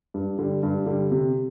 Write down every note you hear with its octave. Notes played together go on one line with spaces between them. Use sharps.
G2
D3 G3
G2
D3 G3
C3